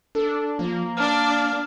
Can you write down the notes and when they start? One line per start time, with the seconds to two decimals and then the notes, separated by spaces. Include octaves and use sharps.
0.15 D4 A4
0.59 F3 A#3
0.97 D4 D5 F6